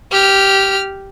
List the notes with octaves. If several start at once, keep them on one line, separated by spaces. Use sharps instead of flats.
G4 F6